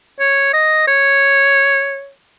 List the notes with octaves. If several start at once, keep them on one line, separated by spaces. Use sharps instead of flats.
C#5
D#5
C#5